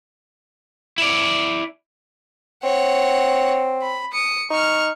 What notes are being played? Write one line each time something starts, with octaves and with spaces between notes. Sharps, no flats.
E4 D5
C4 C#5 F#5
B5
D#6 C#7
D#4 C#6 F6